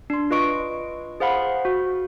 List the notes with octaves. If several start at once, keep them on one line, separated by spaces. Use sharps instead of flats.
D4 C6
F4 B4 D#5 C#6 D7
G#4 C5 F5 F#5 B5
F#4